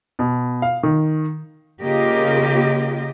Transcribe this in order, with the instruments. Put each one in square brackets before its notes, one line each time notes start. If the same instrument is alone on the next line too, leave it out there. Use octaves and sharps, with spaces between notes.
[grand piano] B2
F5
D#3
[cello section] C#3 A#3 F4 G4 D#5